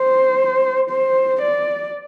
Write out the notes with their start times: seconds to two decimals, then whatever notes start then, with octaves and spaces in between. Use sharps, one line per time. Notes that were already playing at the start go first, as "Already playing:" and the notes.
Already playing: C5
0.90 C5
1.41 D5